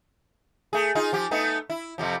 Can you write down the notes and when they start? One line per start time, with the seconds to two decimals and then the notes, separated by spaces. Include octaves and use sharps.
0.73 A3 G#4
0.95 D#4 F4 G#4
1.13 F3 G4
1.31 A3 B3 D#4
1.70 E4
1.98 F2 C3 F3